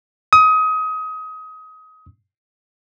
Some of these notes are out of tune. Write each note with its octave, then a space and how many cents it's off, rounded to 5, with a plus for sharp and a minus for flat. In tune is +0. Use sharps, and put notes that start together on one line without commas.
D#6 +25